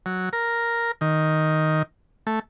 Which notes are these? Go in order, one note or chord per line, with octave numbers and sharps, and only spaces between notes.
F#3
A#4
D#3
A3